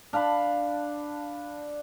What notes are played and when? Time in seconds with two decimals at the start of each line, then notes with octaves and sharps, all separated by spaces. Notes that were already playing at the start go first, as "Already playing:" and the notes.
0.13 D4 F5 A5 B5